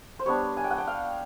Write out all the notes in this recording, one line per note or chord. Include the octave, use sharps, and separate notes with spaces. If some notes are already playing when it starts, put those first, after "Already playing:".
C5
G3 B3 D4 C#5
G#5
G5
F#5
G5
F5